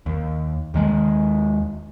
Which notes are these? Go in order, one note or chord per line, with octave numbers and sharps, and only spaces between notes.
D#2
D#2 D#3 G#3